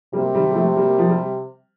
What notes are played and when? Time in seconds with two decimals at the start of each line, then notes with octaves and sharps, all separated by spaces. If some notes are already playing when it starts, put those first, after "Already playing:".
0.13 C3 G3 A#3
0.34 D#3 G3
0.51 G3
0.55 F3 A3
0.76 G3 A#3
0.99 F3
1.09 G3